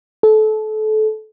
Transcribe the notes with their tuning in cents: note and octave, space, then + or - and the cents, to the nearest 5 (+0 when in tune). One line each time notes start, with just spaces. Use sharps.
A4 -25